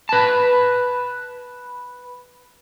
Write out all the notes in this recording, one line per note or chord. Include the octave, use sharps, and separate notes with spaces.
B4 A5